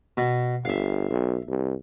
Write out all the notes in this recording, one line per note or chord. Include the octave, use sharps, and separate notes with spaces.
B2
G1 E5 F5
B1
C2